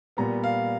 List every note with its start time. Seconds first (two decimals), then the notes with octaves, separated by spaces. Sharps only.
0.17 A#2 G3 B3 A#5
0.44 F5